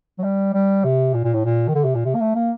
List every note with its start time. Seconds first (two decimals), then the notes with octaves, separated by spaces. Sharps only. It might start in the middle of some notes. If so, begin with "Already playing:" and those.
0.18 F#3
0.23 G3
0.54 G3
0.84 C3
1.14 A#2
1.24 A#2
1.34 A2
1.45 A#2
1.68 D#3
1.75 D3
1.84 C3
1.95 A#2
2.05 C3
2.15 A#3
2.20 A3
2.35 A#3